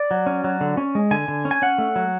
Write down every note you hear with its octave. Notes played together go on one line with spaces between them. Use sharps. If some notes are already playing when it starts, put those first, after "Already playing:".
Already playing: D5
F#3
C#4
F#3
D3
C#4
G#3
D3 G#5
D3
C#4
G#5
C#4 F#5
A3
F#3